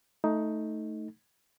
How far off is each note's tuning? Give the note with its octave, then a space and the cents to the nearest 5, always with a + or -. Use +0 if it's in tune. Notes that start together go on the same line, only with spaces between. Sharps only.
A3 +0 D#4 +10